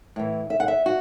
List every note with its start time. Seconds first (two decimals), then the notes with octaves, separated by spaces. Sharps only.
0.16 A2 E3
0.50 E5
0.60 F#5
0.68 E5
0.86 F#4